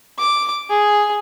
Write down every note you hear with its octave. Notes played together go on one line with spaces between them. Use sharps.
D6
G#4